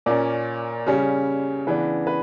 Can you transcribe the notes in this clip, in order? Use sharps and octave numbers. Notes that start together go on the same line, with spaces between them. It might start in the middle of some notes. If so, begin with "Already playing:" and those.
A#2 A#3 C#4 D5
C#3 G3 C#4
C#3 E3 B3 D4 B4
B4